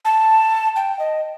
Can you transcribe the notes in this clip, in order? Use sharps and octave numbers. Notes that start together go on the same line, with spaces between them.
A5
G5
D#5